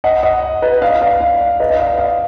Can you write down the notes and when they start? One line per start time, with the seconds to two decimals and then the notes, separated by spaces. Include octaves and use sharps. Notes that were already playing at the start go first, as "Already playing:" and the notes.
0.04 D#5 F#5
0.23 D#5 F#5
0.62 B4 D#5
0.81 D5 F5
1.01 D5 F5
1.20 D5 F5
1.60 B4 D#5
1.70 D#5
1.79 D5 F5
1.99 D5 F5